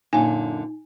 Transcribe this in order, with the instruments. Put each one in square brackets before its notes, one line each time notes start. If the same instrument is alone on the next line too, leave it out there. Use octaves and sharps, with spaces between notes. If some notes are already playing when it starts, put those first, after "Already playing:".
[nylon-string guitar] F#2 A#2 D3 [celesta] D#4 [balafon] G#5